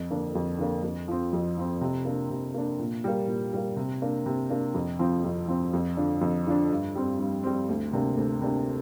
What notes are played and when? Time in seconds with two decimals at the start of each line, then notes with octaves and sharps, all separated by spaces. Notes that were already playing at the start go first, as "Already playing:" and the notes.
Already playing: F2
0.11 D3 A#3 D4
0.35 F2
0.58 D3 A#3 D4
0.83 F2
1.08 F3 C4
1.33 F2
1.57 F3 C4
1.81 C3
2.05 A#3 D4
2.30 C3
2.54 A#3 D4
2.79 A#2
3.04 G3 A#3
3.27 A#2
3.53 G3 A#3
3.76 C3
4.02 A#3 D4
4.26 C3
4.50 A#3 D4
4.74 F2
4.99 F3 C4
5.24 F2
5.48 F3 C4
5.73 F2
5.97 D3 F3 D4
6.21 F2
6.47 D3 F3 D4
6.71 G2
6.95 G3 C4
7.19 G2
7.44 G3 C4
7.69 D2
7.93 C3 A#3 D4
8.17 D2
8.42 C3 A#3 D4